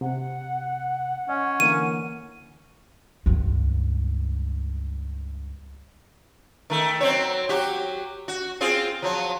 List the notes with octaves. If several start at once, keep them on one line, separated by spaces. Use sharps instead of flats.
C3 F#5
C#4 D#5
D3 E3 A#3 D#7
C#2 G2
D#3 A3
F#3 C4 C#5
F#3 F#4 G4
F#4
C4 F4 G#4
F3 F#3